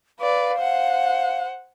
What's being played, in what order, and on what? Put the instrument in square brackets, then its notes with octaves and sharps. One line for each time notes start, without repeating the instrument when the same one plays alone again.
[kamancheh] B4 D5 [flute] F5
[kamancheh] C5 F#5